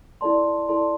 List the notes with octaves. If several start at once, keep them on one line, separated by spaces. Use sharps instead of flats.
E4 A4 D5 A5 C6
E4 A4 D5 A5 C6